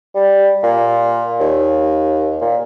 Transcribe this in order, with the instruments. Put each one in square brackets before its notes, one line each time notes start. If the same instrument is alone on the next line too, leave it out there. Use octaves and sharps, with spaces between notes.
[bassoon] G3
A#2
D#2
A#2